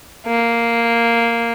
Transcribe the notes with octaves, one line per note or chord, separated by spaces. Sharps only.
A#3